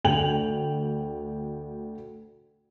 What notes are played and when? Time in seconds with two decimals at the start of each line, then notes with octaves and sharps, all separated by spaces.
0.04 D2 G5 F7 F#7